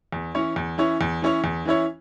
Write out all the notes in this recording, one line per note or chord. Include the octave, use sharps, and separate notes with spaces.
E2
E3 C#4 E4 C#5
E2
E3 C#4 E4 C#5
E2
E3 C#4 E4 C#5
E2
E3 C#4 E4 C#5